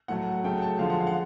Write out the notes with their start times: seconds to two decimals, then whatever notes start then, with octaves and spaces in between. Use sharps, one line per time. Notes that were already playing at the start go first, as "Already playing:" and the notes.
0.08 A2 F#3 A3 F#5
0.44 C#3 F#3 A3 G5
0.62 A5
0.79 D3 F3 G#3 F5
0.90 F#5
1.00 F5
1.07 F#5